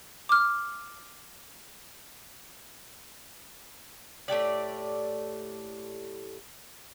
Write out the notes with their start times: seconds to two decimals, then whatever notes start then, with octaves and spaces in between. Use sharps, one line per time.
0.29 D6 F6
4.28 A2 A3 G4 D5